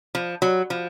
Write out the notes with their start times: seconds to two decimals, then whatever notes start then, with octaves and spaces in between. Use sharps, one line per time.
0.15 F3
0.42 F#3
0.70 F3